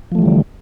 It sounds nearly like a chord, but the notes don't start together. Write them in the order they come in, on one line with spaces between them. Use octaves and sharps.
F3 A3 E3 G3 D3